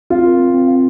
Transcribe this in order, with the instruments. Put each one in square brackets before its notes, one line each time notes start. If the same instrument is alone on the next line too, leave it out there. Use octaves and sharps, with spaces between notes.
[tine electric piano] C4 [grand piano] F4
[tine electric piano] A#4
C4
C4
F5